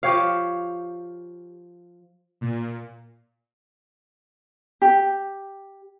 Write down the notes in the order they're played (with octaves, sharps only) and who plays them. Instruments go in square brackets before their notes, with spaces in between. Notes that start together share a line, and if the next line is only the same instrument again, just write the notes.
[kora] F3 G4 C#5 F5
[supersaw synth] A#2
[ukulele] G4